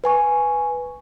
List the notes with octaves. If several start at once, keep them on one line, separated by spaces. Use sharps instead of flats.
B4 G#5 C#6